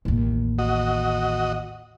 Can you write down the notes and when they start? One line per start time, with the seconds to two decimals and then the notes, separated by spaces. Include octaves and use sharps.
0.05 A1 D#2
0.59 F#4 D#5